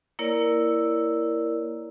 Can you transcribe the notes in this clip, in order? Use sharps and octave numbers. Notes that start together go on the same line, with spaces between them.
A#3 E4 A#4 C#5 D5 E6